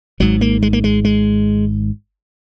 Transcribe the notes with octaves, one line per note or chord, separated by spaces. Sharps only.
G#1 G#2 F#3
A#3
G#3
A#3
G#3
G#3